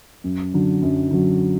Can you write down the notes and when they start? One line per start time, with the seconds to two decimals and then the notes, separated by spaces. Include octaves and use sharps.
0.24 F#2
0.54 D3 F#3
0.82 F#2
1.11 D3 F#3